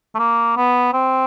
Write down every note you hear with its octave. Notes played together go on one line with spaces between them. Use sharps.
A3
A#3
B3
C4